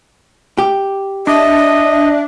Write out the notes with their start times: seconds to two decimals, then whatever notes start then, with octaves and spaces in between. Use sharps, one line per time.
0.58 G4
1.27 D4 D#5 E5